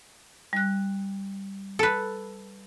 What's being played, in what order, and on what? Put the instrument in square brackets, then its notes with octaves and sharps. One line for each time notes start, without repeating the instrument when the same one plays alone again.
[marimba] G3 F#6
[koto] A4 B4